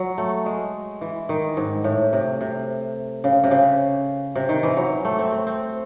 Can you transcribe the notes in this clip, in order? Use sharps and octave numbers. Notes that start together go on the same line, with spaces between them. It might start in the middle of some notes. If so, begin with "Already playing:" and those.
Already playing: F#3
A3
G#3
E3
D#3
G#2
A2
C3
C3
C#3
C3
C#3
C3
D#3
E3
F#3
A3
C4
C4
C4